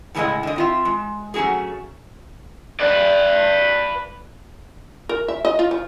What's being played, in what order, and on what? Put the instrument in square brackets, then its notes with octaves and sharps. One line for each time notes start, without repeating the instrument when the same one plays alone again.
[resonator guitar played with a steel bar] A2 C#3 G#3 D4 E4 D#5
D3 D#5
C4 F4 E5
G#3
F#3 A3 C#4 F#4 G#4
[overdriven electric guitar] B4 D5
[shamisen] A#4
E5
D#5
F4
F3